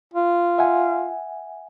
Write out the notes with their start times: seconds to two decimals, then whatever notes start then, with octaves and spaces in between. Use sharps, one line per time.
0.14 F4
0.58 E5 F#5 G#5